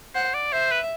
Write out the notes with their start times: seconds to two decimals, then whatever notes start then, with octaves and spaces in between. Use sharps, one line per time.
0.15 C5 F#5
0.34 D5
0.52 C5 E5
0.71 B4